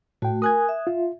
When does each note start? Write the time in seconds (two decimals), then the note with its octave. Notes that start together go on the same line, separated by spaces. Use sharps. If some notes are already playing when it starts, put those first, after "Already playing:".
0.22 A2 A3 F#4 G5
0.42 A#4 G#5 D#6 F#6 G#6
0.69 E5
0.87 F4